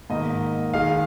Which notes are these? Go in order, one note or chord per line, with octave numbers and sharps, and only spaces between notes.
G#2 D#3 A#3 D#4 D#5
D#3 G#3 D#4 F5